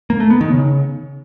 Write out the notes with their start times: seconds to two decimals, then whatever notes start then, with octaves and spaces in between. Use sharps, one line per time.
0.10 A#3
0.20 A3
0.30 B3
0.41 D#3
0.51 C#3